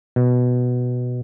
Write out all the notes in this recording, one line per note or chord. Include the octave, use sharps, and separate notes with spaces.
B2